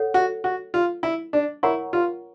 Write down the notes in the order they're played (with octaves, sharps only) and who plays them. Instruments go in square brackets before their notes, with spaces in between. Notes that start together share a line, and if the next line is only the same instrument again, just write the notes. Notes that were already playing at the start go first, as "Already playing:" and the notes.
Already playing: [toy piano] A4 C#5 F#5
[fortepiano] F#4
F#4
F4
E4
D4
[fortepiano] E4 [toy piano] A#4 C#5 F#5 A#5 C#6
[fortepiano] F4